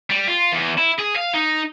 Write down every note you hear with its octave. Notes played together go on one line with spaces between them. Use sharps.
G3
F4
E2
E4
G#4
F5
D#4